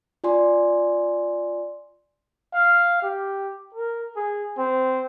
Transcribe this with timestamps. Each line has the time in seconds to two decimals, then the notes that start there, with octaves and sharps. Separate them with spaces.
0.24 F4 D5 G#5 C6
2.54 F5
3.02 G4
3.74 A#4
4.16 G#4
4.58 C4